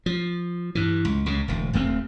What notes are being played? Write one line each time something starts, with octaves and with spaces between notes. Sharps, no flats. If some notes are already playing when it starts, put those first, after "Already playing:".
F3
G2 E3
C#2
C#2 C#3
E1 D2
D#1 D#2 A3 C4